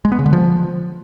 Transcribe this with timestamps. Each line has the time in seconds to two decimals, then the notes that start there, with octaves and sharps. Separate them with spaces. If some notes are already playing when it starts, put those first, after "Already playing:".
0.05 G#3
0.12 B3
0.19 C#3
0.26 D3
0.33 F3